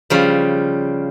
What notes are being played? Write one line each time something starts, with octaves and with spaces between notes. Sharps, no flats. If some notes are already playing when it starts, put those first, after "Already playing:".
C#3 F3 G3